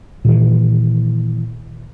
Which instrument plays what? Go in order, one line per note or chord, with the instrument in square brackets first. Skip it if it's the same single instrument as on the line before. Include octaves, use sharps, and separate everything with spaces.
[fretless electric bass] A#2 D#3 E3